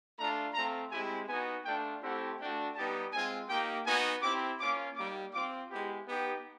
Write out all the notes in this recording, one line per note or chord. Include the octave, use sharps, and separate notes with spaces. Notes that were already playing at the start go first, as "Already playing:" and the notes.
A3 D4 F4 A#5
A3 C4 F4 A#5
G#3 C4 E4 G4 G#5
B3 D#4 F#4 G#5
A3 D4 F4 G5
A3 C4 E4 G4 F#5
A3 D4 F#4 G5
G3 B3 D#4 G4 A5
G#3 C4 F4 G#5
A#3 D#4 G4 G5
B3 D#4 F#4 G#5
C4 E4 G4 D6
A#3 C#4 F4 D6
G3 A#3 D#4 D6
C4 F4 D6
G#3 B3 E4 G4
B3 D#4 G4